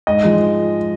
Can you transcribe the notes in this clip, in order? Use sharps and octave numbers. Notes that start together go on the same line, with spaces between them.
G#2 D#5
F3 G#3